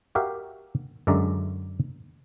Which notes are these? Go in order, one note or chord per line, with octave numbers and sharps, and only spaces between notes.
F#4 G4 A#4 E5 F5
F#2 D3 G#3 D5 E5 A#5